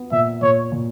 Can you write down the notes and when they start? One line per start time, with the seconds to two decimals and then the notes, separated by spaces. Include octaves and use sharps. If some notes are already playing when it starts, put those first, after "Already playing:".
Already playing: B3
0.11 A#2 E5
0.41 A#2 C#5
0.72 A#2